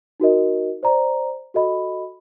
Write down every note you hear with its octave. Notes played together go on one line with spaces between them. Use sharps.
D#4 F#4 A#4 D#5
C5 D5 A#5
F#4 A4 D#5 B5